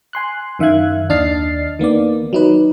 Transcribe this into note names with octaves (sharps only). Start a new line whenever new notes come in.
G#5 C6 F#6
F#2 D#3 E5 F5 F#6 G#6
D#2 D4 D#5 F6 A6 C7
D#3 A#3 B3 D5
F#3 D#4 B4